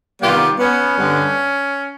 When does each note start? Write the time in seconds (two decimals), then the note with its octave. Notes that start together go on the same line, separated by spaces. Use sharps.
0.22 C3 D#3 G3 B3 F4 G4
0.59 B3 C#4
0.95 G2 D3 G3 B3